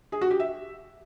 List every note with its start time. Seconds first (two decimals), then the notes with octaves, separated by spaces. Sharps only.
0.12 G#4
0.21 F#4
0.31 G4
0.40 E5